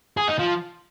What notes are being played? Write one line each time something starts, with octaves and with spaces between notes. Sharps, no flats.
G#4
D#4
F3